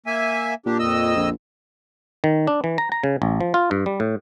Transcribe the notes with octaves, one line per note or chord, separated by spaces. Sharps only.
A#3 E5 G#5
A#2 D4 G4
F2 D#5 E6
A#1
D#3
D4
E3
A#5
A#5
C#3
A1
F3
F4
G2
G3
A2